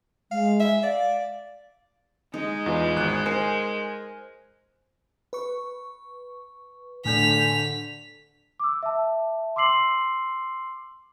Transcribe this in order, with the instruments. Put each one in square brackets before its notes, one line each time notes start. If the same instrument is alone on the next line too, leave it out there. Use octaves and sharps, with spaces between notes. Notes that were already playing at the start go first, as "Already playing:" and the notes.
[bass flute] G#3 [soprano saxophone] F5
[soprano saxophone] E5
[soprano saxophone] D5 [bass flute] F5
[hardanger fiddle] G#3 [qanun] D#4
[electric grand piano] E2 F4 B4
G#1 F#6
[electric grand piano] A#4 G#5 [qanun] C5
[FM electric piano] B4 C#6
[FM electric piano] A2 G#5 G6 [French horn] D3 [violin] B6 F7
[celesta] D6 E6
E5 A5
C6 D6 E6 C7 F#7